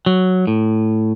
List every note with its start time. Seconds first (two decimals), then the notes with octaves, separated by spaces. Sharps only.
0.06 F#3
0.47 A2